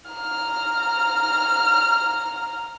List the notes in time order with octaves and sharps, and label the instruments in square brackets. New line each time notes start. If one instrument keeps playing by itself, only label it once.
[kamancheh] A#5 F6